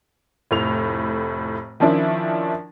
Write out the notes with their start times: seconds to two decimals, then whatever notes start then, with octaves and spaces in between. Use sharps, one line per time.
0.51 F1 A2 F7
1.80 D#3 F3 C#4 D4 E4